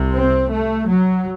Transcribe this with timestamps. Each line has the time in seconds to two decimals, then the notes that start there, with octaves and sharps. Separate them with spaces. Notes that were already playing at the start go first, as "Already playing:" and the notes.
Already playing: C2 C3
0.14 C4
0.50 A3
0.88 F#3